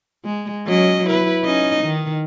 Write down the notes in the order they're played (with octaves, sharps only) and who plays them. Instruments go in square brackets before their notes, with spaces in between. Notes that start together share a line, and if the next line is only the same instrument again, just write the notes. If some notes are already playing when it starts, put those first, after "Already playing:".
[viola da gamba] G#3
F#3 C#4 D#5
E4 B4
C#4 D#4 D#5
D#3